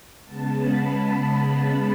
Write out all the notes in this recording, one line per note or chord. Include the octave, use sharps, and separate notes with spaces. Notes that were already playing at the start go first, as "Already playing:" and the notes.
C#3 G#3 B3 A5
B5